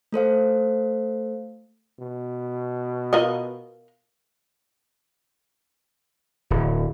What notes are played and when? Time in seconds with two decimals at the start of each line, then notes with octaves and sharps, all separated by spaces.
0.12 A3 A4 C5 F5
1.99 B2
3.13 F4 A#4 D#5
6.50 D1